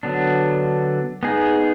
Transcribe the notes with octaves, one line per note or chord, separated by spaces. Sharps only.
D3 F#3 B3 D4
B3 D#4 G#4